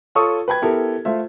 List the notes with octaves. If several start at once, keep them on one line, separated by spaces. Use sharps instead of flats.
F4 A4 C#5 C#6 D#6 E6
B4 G5 B5 G#6
B3 E4 G4 A4 A#4
A3 F4 C5 E5